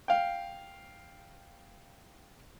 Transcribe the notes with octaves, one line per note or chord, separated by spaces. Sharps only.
F5 G5